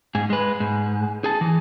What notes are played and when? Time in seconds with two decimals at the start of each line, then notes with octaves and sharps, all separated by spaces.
0.15 G#2 G#4
0.30 G#3 B4
0.60 G#2
1.24 G#4 A5
1.41 E3